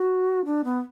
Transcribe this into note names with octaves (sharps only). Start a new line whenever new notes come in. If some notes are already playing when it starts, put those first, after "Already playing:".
Already playing: F#4
D4
B3